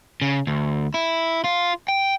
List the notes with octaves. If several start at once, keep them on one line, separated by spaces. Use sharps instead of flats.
C#3
D2
E4
F4
G5